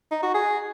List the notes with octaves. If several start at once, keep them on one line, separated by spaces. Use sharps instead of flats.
D#4
F#4
G#4